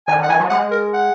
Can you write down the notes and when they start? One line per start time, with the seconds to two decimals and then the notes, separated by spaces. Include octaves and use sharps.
0.07 D#3 G#5
0.18 D#3
0.23 F#5
0.29 E3 G#5
0.40 F#3
0.50 G#3 F#5
0.71 A#4
0.93 F#5